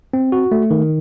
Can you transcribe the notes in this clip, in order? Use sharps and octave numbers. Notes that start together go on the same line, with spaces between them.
C4
F#4
A3
D#3